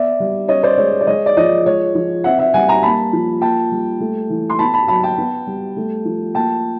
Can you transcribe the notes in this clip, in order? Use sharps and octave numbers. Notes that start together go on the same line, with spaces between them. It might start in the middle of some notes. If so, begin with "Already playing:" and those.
Already playing: B3 D5 E5
G3
C#4 C#5 D#5
C5 D5
G#3 C#5
D5
G#3 C#5 D#5
D5
F3 C#5 D#5
G#3 C#5
F3
C4 E5 F#5
E5 F#5
G3 F#5 G#5
G#5 A#5
A#3 A5 B5
F3
A#3 G5 A5
G3
A3
E3
C6
B3 A5 B5
A5 B5
F#3 A5 B5
G5 A5
B3
G3
A3
F3
A#3 G5 A5